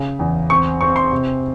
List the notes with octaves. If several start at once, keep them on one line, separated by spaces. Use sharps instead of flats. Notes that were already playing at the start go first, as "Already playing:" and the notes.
Already playing: C#3
E2
C4 C#6
C4 C#6
C6
C3